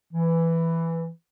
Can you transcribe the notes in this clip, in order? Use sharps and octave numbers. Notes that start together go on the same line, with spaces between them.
E3